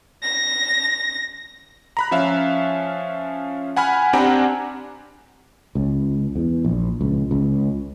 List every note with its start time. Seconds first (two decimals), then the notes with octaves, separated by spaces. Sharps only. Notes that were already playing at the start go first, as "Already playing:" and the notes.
0.23 A#6
1.97 A#5 B5 F#6
2.11 F3 C#4 E5 F5
3.76 F#5 G#5 B5 F6
4.13 C4 D4 G4 F#5 G#5 A#5
5.75 C#2
6.36 E2
6.65 A#1
7.01 C#2
7.31 C#2